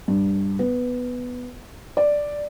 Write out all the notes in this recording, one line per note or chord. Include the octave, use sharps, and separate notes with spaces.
G2
B3
D5